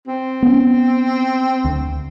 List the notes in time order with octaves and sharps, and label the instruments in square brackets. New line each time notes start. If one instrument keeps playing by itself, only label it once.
[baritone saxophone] C4
[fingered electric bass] B3 C#4
D2